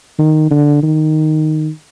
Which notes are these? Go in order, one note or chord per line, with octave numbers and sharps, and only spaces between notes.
D#3
D3
D#3